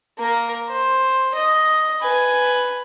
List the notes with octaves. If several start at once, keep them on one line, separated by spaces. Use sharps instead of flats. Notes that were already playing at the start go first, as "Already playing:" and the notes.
A#3 A#4
C5
D#5
B4 G#5